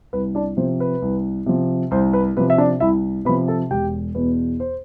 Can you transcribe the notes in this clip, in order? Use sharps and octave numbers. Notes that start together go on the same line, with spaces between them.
C2 B4
D4 D5
C3 F3 C5
B4
C2
C3 F3
C2 C5
B4
C3 F3 B4
E5
D4 D5
C2 E4 E5
C3 F3 B4 B5
A4 A5
E1 G4 G5
E2 B2 B4
C5